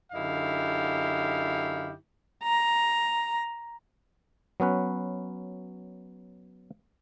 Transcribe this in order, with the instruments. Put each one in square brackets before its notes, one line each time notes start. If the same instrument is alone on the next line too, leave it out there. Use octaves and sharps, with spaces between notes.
[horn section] F#2 D3 D#4 E4 G4 F5
[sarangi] A#5
[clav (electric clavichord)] F#3 B3 C#4 B4